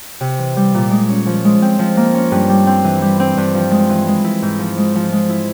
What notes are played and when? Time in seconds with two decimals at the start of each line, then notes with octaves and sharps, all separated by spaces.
0.21 C3
0.39 E3
0.56 G3
0.74 A#2
0.91 G#3
1.09 C#4
1.26 F3
1.45 G#3
1.62 C4
1.79 F3
1.97 A#3
2.14 C#4
2.32 G2
2.49 G3
2.67 C4
2.84 E3
3.02 G3
3.20 C4
3.37 G2
3.54 F3
3.71 G#3
3.89 E3
4.07 G#3
4.24 E4
4.42 G#2
4.59 F3
4.78 G#3
4.95 F3
5.12 G#3
5.29 E4